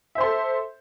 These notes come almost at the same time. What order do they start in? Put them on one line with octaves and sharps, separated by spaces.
E5 C5 C6 A4